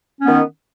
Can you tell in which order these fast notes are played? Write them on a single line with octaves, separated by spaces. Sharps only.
C#4 B3 D#3